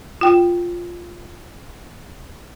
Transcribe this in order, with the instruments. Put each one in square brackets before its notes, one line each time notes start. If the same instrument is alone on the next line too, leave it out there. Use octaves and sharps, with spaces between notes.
[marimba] F4 G5